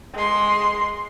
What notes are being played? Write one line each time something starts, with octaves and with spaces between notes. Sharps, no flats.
G#3 C6